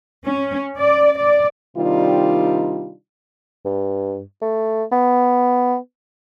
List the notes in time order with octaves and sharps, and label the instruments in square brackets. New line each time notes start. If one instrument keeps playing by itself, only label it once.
[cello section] C#4
D5
D5
[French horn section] C3 D#3 G3 D4 D#4 F4
[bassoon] G2
A3
B3